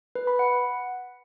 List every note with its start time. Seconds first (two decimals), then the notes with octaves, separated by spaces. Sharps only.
0.15 B4
0.27 B5
0.39 F#5